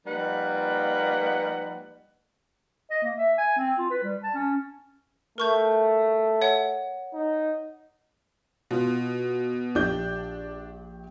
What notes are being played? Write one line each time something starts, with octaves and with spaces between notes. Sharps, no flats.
F3 G3 A#3 D#4 B4 F#5
D#5
A#3
E5
G#5
C4
F4
B4
G3
A5
C#4
A3 A#4 C#6 G6
C#5 F#5
D#4
B2 F4
A#1 D4 G4 G6